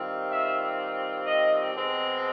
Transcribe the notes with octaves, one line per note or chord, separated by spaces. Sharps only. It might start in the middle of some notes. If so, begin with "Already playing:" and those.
Already playing: D#3 G3 C4 F4
E5
D#5
B2 G#3 C4